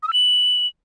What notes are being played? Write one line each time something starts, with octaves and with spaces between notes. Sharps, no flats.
D#6
E6
F#7